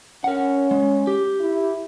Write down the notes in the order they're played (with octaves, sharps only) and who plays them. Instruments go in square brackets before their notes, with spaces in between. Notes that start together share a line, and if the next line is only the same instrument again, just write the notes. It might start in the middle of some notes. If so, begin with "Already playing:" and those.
[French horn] C#4 [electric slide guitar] A#4 F#5
[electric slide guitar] G#3
G4
[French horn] E4